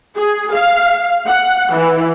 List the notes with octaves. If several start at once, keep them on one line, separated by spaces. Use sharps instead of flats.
G#4
F5
F#5
E3